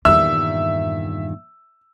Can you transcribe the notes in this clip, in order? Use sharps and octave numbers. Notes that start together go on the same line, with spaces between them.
E2 G2 A#2 D#3 G3 E5 E6